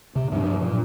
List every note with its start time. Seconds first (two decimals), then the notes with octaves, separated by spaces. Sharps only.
0.16 C3
0.32 G2 F3 F#3 D4
0.62 A#2